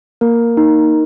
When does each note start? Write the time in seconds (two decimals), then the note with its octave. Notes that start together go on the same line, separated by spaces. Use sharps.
0.21 A#3 A#4
0.57 D#4